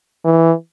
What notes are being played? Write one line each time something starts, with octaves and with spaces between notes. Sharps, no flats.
E3